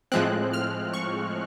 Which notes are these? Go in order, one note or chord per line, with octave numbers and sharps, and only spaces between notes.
A2 F3 G#3 C4 F#6
F6
C#6